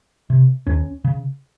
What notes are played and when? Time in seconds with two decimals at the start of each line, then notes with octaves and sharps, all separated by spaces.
0.30 C3
0.67 D#2 C#4
1.04 C#3